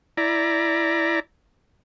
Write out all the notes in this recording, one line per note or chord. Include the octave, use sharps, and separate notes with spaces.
E4 D5 A#5